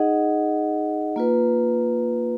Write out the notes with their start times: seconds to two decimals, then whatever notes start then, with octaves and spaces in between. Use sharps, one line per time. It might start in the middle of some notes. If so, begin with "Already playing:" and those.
Already playing: D#4 G#4 D#5 F#5
1.16 A#3 F4 B4